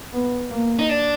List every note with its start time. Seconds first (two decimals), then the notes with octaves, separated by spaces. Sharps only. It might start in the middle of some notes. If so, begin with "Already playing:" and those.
0.13 B3
0.51 A#3
0.79 D#4
0.89 D4